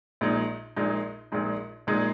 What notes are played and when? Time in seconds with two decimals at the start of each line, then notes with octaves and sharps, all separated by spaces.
0.21 A#1 A#2 G#3 D#4
0.76 A#1 A#2 G#3 D#4
1.32 A#1 A#2 G#3 D#4
1.87 A#1 A#2 G#3 D#4